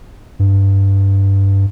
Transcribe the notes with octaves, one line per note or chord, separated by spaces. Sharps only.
G2